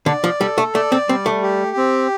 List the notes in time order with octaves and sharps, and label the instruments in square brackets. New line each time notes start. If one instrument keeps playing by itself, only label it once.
[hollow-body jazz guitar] D3 [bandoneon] D5
[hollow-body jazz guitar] F3
[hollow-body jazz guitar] G3 [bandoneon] A4
[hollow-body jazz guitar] A3
[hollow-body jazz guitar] A3 [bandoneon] D5
[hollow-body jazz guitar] C4
[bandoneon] G3 [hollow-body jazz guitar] C4
[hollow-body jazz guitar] A3
[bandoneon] G4
C4